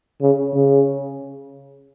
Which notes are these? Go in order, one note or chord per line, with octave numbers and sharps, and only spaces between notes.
C#3
C#3